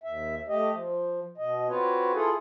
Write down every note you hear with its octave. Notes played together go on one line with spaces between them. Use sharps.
D#2 E5
A3 G4 D#5
F3
B2 D#5
C4 F4 F#4 B4 C#5
E4 F4 G#4 A4